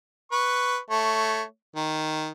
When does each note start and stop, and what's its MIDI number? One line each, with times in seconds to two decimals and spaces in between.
0.32 0.78 71
0.32 0.78 85
0.90 1.42 57
0.90 1.42 73
1.76 2.30 51